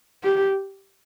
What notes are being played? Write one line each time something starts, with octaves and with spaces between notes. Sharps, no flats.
G4